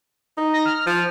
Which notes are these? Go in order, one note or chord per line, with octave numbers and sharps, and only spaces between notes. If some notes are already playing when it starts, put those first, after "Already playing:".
D#4
A#6
F6
F3